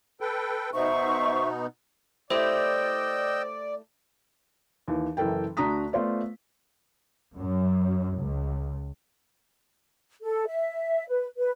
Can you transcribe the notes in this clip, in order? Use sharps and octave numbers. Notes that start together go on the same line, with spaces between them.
A4 B4 G5
B2 B3 D#4 C5 E5 C#6
A3 E4 G4 C5 D5 D#5 G5 E6
D#2 E3
F#1 E3 A4 A#4 G5
D2 D4 F#4 A#5 D#6 B6
A3 B3 F4 C5 D5
F#2
C#2
A4
E5
B4
B4